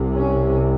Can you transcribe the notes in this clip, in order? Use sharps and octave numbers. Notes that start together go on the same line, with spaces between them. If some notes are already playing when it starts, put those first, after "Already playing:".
Already playing: C2 C3
C#4